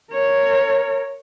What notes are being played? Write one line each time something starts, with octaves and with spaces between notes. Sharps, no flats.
A#4 C#5